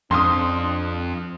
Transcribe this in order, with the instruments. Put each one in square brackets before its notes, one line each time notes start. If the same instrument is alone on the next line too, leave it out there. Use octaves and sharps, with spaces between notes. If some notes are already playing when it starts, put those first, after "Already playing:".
[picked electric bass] F2 [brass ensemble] C4 D4 [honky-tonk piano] C6 D#6